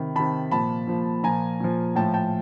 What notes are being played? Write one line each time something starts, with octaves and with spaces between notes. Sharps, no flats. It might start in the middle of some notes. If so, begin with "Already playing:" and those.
Already playing: C3 D#3 B5
C3 D#3 A5 B5
A#2 F3 A5 B5
A#2 F3
A#2 F3 G#5 A#5
A#2 F3
A2 F3 G5 A5
G5 A5